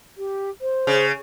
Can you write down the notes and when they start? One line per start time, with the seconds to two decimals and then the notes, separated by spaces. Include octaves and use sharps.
0.17 G4
0.61 C5
0.87 C#3